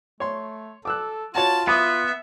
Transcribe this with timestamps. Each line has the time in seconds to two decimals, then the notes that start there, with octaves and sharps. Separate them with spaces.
0.20 A3 C#5 C6
0.85 A4 D6 E6 F#6
1.35 F4 F#4 C#5 A5
1.68 B3 E5 B5 D6 D#6